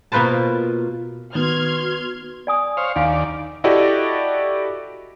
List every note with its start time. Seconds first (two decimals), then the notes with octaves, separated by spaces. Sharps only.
0.12 B2 A#3 F4 B4 C5 A5
1.35 D#3 B3 F#4 C6 F6 G#6
2.47 D5 G#5 D#6
2.77 C5 C#5 F5
2.96 D#2 D4 D5 F5 G#5
3.64 E4 F#4 G4 A4 D5 D#5